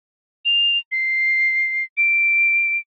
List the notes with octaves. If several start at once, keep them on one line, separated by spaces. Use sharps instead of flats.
F7
C7
D7